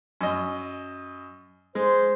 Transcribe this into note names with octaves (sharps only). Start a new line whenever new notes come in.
F#2 D#5
G#3 C5